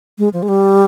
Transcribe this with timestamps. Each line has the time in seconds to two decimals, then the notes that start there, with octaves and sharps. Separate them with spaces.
0.18 G#3
0.33 F3
0.43 G#3
0.48 G3